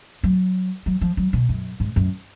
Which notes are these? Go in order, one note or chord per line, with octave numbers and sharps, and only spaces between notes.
F#3
F#3
F3
F#3
B2
F#2
G#2
F#2